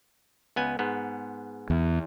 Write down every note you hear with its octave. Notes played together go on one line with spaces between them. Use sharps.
C#2 B3 G#5
G#2 B3
E2